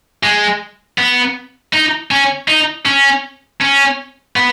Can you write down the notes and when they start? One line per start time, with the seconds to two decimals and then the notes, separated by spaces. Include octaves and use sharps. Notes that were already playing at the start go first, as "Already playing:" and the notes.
0.23 G#3
0.98 B3
1.73 D#4
2.11 C#4
2.48 D#4
2.86 C#4
3.61 C#4
4.36 B3